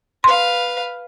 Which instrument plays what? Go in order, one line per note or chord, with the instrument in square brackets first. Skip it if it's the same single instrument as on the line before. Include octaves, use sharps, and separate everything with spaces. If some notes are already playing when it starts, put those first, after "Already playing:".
[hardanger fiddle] B4 F5 [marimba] C6